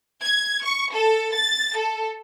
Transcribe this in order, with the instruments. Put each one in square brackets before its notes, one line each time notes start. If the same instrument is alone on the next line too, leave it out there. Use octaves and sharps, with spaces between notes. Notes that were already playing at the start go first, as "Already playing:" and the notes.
[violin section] G#6
C#6
A4
A6
A4